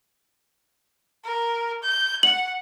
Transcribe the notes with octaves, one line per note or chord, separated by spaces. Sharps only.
A#4
G6
F#5 F#7